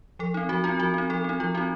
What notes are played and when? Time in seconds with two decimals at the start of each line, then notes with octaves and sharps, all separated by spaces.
0.19 F3 A4
0.34 C4 D#4
0.49 F3 F#4
0.64 C4 D#4 F4
0.79 F3 F#4
0.94 C4 D#4
1.10 F3 A4
1.24 C4 D#4
1.40 F3 F4
1.55 C4 D#4 F#4